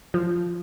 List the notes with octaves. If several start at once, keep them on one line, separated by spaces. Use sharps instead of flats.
F3